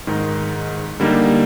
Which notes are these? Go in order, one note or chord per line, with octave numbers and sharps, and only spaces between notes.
G#2 D#3 G#3 D#4
D3 G3 A#3 D#4